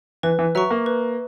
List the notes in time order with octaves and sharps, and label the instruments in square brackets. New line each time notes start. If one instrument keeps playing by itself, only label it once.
[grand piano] E3 [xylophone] B4
[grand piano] E3
[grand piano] F#3 [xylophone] E5 A#5 C#6
[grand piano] A#3
[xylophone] B4